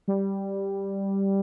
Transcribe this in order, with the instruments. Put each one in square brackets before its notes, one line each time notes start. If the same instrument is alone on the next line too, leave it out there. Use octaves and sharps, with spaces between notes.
[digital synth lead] G3